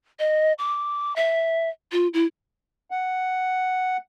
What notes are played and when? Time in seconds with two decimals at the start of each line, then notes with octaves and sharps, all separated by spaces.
0.19 D#5
0.59 D6
1.16 E5
1.92 F4
2.14 E4
2.91 F#5